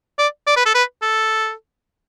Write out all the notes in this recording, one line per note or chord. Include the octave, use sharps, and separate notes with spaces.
D5
D5
B4
A4
B4
A4